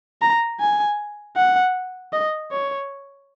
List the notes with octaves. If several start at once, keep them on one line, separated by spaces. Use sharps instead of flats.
A#5
G#5
F#5
D#5
C#5